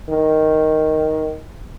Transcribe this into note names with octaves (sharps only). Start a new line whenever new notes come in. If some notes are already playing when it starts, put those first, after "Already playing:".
D#3